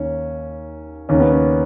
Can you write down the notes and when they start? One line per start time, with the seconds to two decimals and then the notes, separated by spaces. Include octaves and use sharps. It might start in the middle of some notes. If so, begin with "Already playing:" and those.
Already playing: D#2 C#4
1.09 D#2 C#3 C#4
1.20 B3
1.30 C#4